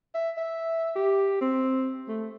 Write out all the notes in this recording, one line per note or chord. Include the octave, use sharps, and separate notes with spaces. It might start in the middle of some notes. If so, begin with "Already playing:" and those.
E5
E5
G4
C4
A3